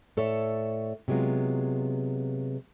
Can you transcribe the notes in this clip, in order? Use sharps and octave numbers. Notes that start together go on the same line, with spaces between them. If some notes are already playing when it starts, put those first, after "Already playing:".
A2 A4 C#5 D5 E5
C3 F#3 G#3 B3 F4